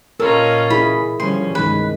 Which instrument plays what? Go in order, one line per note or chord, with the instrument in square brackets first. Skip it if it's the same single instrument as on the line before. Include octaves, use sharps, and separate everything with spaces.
[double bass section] A#2 C#3 [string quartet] C#4 F4 D#5 [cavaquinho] A4 [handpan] A#4
[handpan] E4 G#4 [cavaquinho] B5
[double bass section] D3 F3 G3 [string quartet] C#4 [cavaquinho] C6
[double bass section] C2 G2 [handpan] D#3 G#3 [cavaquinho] B4